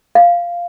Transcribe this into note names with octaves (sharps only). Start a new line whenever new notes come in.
F5